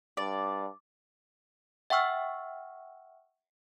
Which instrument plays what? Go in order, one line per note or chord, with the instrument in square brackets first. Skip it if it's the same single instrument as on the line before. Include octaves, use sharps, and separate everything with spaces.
[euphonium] G2 [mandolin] D5
[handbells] E5 F#5 G5 C#6 E6 F6